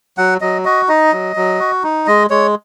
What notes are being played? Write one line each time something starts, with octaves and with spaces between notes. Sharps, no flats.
F#3 F#5
F#3 D#5
F#4 D#5
D#4 D#5
F#3
F#3
F#4
D#4
G#3 D#5
G#3 C#5